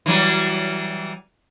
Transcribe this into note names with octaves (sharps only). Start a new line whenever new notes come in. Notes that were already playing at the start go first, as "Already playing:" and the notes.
E3 F#3 G3